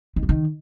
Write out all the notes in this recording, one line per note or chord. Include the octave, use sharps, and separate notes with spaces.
D#3
F#2
D#3